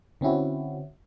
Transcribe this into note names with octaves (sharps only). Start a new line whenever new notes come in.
D3 C4 C#4 E4 F#4